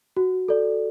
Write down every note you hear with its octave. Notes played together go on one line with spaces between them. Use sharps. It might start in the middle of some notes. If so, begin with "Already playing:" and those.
F#4
A4 D5